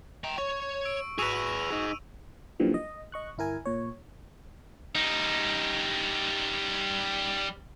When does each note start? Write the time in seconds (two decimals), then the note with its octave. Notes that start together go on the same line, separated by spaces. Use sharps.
0.24 G5 A#5
0.38 C#5 C#6
0.85 E6 D7
1.18 G#1 F#4 G#4 B4 E6 D#7 F7
1.70 F1 D#4 G#4
2.60 F#2 A#2 D3 E3 F3 G3
2.74 D#5
3.12 D#5 C#6 F#6
3.38 G1 E4 A#4 G#5
3.65 A#2 C#5
4.95 G3 D#4